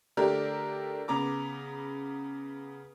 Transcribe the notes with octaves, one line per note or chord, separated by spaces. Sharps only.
D3 A3 D4 G4 A#4 D5
C#3 B3 A#5 D6